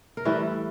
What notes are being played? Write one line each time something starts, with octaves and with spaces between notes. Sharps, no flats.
A#4
A2 E3 G3 B4